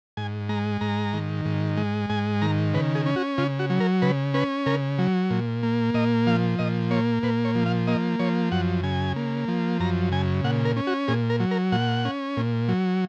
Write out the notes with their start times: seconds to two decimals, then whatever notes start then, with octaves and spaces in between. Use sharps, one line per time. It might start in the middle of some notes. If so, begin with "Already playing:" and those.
0.17 G#2 G#5
0.49 G#3 A#5
0.81 G#2 A#5
1.13 D#3
1.45 G#2
1.77 G#3
2.10 G#2 G#5
2.42 D#3 A#5
2.74 C#3 B4
2.95 G#4
3.06 C#4
3.16 F#4
3.38 C#3 F4
3.59 F#4
3.70 F#3
3.80 A#4
4.02 C#3 B4
4.34 C#4 B4
4.66 C#3 A#4
4.99 F#3
5.30 A#2
5.63 A#3
5.94 A#2 D#5
6.27 F3 F5
6.59 A#2 D#5
6.91 A#3 C#5
7.23 A#2 B4
7.45 C#5
7.55 F3
7.66 F5
7.87 A#3 D#5
8.19 F3 C#5
8.52 F#2 F#5
8.84 C#3 G#5
9.16 A#3
9.48 F3
9.80 F#2 A#5
10.12 C#3 G#5
10.44 A#2 F#5
10.65 A#4
10.77 C#4
10.87 F#4
11.08 A#2 G#4
11.30 A#4
11.40 F#3
11.51 A#4
11.72 A#2 F#5
12.05 C#4
12.37 A#2
12.68 F#3